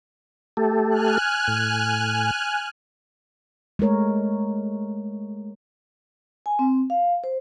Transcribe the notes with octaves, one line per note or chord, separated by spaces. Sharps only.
A3 G4 A4
G#5 F6 F#6
A2
G#3 A3 A#4 C#5
G#5
C4
F5
C5